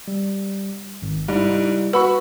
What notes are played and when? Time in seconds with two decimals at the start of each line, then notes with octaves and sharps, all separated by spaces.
0.08 G3
1.02 G#1
1.28 G#2 G3 E4
1.93 F#4 B4 B5 C#6